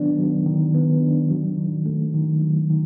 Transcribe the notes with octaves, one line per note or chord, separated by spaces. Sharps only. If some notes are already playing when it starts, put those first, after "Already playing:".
Already playing: D#3 F#3 B3 D4
F#3
D#3
B3
D4
F#3
D#3
A3
D#3
F#3
D#3